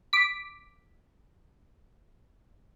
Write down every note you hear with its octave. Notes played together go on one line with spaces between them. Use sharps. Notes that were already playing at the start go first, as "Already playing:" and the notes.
D6 B6